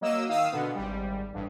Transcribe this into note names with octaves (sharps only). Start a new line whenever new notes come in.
F#3 A#3 D#5 E6
D#3 F5 D#6 E6
B2 D3 B3
G#1 G3
A1 G2